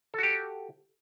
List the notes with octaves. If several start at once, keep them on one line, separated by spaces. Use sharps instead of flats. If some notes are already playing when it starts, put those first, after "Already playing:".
F#4 G4 A4